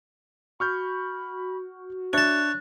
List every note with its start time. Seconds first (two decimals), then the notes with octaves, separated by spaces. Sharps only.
0.60 F#4 B5 C#6 F6 G6
2.13 D4 C#5 E5 A5 F#6 A6